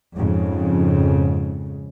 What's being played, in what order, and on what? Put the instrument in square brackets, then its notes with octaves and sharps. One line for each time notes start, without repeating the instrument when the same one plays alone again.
[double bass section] F2 G#2 C#3